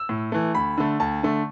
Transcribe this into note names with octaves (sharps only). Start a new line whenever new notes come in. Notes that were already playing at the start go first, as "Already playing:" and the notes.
Already playing: E6
A2
E3 A3
D2 B5
D3 A3
D2 A5
D3 A3